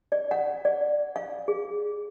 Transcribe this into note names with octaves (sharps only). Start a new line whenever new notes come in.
D5
F#5
D5
F5
G#4